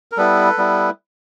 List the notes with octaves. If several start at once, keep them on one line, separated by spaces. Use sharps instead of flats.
A#4
G3 B3 E4 A4 B4
G3 B3 E4